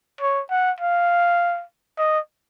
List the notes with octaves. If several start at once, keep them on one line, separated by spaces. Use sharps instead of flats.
C#5
F#5
F5
D#5